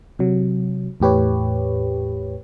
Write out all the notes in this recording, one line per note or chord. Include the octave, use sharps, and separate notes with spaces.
C3 F#3
E2 A2 G4 B4 C#5